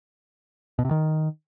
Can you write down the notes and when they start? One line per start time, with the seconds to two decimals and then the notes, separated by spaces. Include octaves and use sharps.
0.79 B2
0.85 C3
0.91 D#3